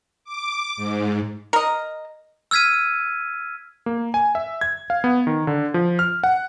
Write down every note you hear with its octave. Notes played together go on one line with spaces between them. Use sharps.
D6
G#2
A#4 D#5
E6 F6 G#6 B6 D#7
A#3
G#5
E5
G#6
F5
B3
D#3
D3
F3
F6
F#5